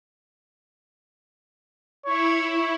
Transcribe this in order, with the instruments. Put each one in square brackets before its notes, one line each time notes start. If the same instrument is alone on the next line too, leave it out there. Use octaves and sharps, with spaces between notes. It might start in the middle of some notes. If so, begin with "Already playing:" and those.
[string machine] E4 [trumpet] C#5